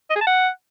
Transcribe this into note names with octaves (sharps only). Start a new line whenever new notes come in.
D#5
G#4
A5
F#5